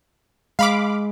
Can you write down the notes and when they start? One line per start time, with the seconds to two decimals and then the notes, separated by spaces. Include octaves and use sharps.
0.59 G#3 F5 B5 D6